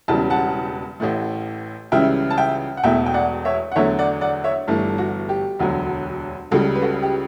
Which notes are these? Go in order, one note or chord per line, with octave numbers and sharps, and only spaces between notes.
E1 E2 C#3 E3 G3 A5
F#5 A5
A1 A2 E3 A3
C#2 C#3 E3 G3 E5 G5
A5
E5 G5
F#5
E1 E2 B2 A3 E5 G5
G5
D5 F#5
C#5 E5
F#5
E2 D3 F#3 A3 C#5 E5
D5 F#5
D5 F#5
C#5 E5
G1 G2 E3 A3
F#4
G4
E1 D2 D3 F#3
C#2 C#3 G3 F#4 A4
B4
F#4 A4
G4